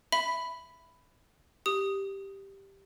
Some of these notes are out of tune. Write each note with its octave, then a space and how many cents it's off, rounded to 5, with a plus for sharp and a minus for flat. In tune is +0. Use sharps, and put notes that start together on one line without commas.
E5 +0 B5 +10
G4 +0 D#6 +0